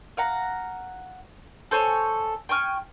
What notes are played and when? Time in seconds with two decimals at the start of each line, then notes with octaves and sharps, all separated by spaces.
0.17 F5 F#5 A#5
1.71 A4 C5 C#5 G#5
2.49 G5 G#5 C#6 F6